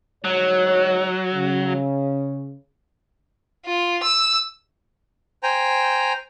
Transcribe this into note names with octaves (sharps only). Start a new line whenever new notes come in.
D2 G#2 F#3 C#5
C#3
F4
E6
C5 G5 G#5 A#5